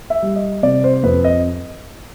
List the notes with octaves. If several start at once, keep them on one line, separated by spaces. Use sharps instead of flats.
E5
G3
D#5
C3 D5
C5
F2 B4
D#5